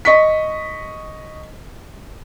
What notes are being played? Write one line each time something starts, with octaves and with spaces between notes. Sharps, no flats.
D#5 C#6 B6